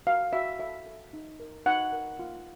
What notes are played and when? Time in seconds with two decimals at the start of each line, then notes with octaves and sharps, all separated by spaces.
0.07 F#4 F5
0.33 F#4 E5
0.59 A4 E5
0.87 A4
1.13 D#4
1.40 A#4
1.66 D#4 F#5
1.92 A#4
2.19 F4